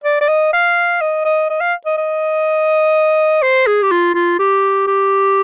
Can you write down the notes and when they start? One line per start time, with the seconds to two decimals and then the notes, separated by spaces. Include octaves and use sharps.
0.04 D5
0.21 D5
0.29 D#5
0.53 F5
1.01 D#5
1.25 D#5
1.50 D#5
1.61 F5
1.86 D#5
1.98 D#5
3.42 C5
3.67 G#4
3.82 G4
3.92 F4
4.15 F4
4.39 G4
4.87 G4